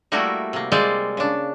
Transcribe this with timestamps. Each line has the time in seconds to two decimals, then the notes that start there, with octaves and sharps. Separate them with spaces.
0.12 G3 A3 A#3 E4 F#4 A#4
0.53 C3 A#3
0.72 G3 G#3 C4 F4 C5 D5
1.17 C#3 D4